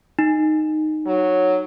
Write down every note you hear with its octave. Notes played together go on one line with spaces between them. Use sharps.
D#4
F#3